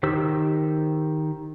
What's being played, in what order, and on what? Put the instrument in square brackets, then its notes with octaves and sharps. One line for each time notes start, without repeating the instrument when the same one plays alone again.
[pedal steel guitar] D#3 G4 C5 E6